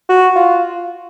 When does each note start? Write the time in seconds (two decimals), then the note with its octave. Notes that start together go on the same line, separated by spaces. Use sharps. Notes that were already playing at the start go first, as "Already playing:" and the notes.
0.09 F#4
0.36 F4